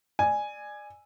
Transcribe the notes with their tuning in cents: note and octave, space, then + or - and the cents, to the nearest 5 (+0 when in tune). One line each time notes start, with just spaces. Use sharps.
D5 +30 G#5 +0